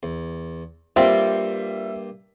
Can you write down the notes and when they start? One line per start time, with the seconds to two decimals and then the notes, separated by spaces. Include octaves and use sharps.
0.03 E2
0.96 G2 G3 A#3 C4 F4 G4 E5